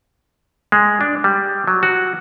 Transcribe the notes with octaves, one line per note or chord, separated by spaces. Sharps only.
G#3
D4
G3
F#3
F#4